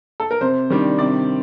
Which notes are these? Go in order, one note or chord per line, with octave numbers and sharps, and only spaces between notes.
A4
A#4
C3 C5
D#3 G3 D4
C3 D5